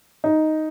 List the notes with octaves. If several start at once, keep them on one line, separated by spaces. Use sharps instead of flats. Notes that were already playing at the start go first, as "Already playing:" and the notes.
D#4